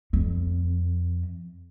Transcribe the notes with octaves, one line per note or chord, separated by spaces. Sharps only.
F2